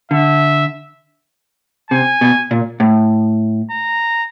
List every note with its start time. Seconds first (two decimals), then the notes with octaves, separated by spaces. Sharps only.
0.11 D3 E5
1.91 C3 G#5
2.21 B2
2.51 A#2
2.80 A2
3.71 A#5